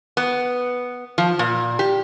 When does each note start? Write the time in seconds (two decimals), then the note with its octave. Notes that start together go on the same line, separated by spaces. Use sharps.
0.17 B3
1.18 F3
1.39 A#2
1.79 G4